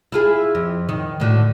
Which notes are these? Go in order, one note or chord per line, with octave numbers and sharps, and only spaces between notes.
E4 F4 G#4
F2
D#3
A2 D3 F#4